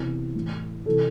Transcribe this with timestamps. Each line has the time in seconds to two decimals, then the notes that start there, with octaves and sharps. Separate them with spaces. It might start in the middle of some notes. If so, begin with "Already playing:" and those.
Already playing: E2 C3 E3
0.35 A2 E3
0.86 C3 E3 A4